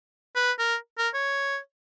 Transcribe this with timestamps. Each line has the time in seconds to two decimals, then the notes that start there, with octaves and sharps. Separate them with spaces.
0.36 B4
0.59 A#4
0.98 A#4
1.14 C#5